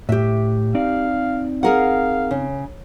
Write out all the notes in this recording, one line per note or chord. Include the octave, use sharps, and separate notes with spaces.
A2 G4 E5
C4 D#4 D5 F5
G#4 A#4 F5 F#5
C#3